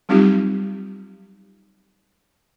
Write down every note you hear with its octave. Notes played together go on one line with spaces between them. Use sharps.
F#3 G3 C4 D#4 F4 G4